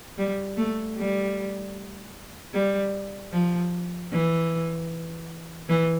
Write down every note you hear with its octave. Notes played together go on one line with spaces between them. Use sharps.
G3
A3
G3
G3
F3
E3
E3